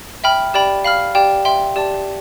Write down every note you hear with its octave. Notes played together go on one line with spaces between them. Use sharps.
E5 G5 B5 F6
G4 D5 G5 B5
F5 B5 F6
G4 D5 G5
E5 G5 C6
G4 D5 A5